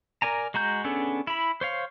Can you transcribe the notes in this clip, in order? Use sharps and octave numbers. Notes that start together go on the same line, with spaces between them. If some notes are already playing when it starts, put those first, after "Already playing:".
A#4 D5 G#5 A#5
G#3 F#4 A#5 G6
B3 C#4 D4 G#4 A4
E4 B5
C5 C#5 F5